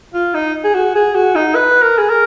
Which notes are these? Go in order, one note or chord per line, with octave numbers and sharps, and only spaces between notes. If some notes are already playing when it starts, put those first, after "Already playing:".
F4
D#4
G#4
F#4
G#4
F#4
D#4
B4
A#4
G#4
A#4